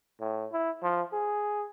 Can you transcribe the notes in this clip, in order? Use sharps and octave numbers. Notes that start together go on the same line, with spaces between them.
A2
E4
F3
G#4